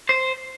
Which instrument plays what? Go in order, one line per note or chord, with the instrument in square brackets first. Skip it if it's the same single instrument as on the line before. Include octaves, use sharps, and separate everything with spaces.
[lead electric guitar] C5